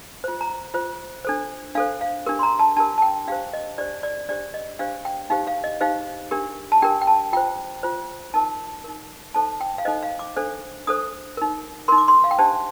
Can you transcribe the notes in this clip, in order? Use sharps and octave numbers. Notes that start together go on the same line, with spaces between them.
F4 C5
A#5
F4 C5
D4 A4 C5
D4 A4 C5 F5
F5
D4 G4 A#4
C6
A#5
A5
D4 G4 A#4 A5
A5
G5
D4 G4 C5 F5
D#5
D4 G4 C5 D5
D5
D4 G4 C5 D5
D#5
D4 G4 C5 F5
G5
D#4 G4 C5 F5
F5
D#5
D#4 G4 C5 F5
D4 G4 A#4
A5
D4 G4 A#4 G5
G5
A5
F4 C5 G5
F4 C5
D#4 A#4 A5
D#4 A#4
D#4 A4 C5 A5
G5
F5
D#4 A4 C5 D#5
F5
D6
D4 A4 C5
D4 A4 C5 D#6
D#4 A#4
D#4 A#4 C6
D6
C6
F5
G5
D4 G4 C5 A5